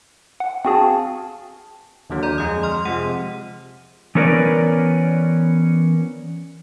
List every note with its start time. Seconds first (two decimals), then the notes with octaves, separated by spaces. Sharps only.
0.40 F#5
0.65 C4 F#4 G#4 F5 G#5 A5
2.10 D#2 D3 F#3
2.23 D5 A#5
2.38 F2 G#3 D#6
2.63 C6 F6
2.85 C3 F3 G#3 F#5 D#7
4.15 E3 B3 C#4 A#4 B4 D5